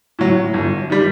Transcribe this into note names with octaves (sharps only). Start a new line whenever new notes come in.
A2 F#3
G1
D#3 G3